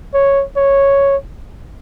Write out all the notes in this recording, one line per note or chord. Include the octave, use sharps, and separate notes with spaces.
C#5
C#5